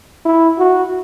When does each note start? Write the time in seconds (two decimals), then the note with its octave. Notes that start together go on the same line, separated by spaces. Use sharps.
0.25 E4
0.59 F#4